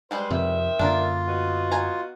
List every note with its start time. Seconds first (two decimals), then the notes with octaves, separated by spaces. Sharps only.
0.11 G3 G#3 B4 C5
0.30 F2 C3 D#3 C4 E5
0.79 F#2 D3 A#3 D4 F4 A#4
1.28 B3 D#4 F#4
1.72 G#5 A#5